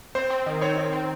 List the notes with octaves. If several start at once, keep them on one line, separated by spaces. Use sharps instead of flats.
C4 C5
C4
D#3
C4 C#5
D#3
C4